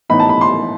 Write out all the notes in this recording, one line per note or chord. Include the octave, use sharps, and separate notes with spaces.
A2 E3 B3 D#4 B5
A5
B5
C6